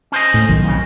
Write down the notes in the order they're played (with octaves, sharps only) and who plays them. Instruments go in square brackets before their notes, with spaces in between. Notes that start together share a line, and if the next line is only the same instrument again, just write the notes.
[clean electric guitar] C#4 C5 D#5
[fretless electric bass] A2
B1 F#2 D#3
[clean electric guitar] F2 C#3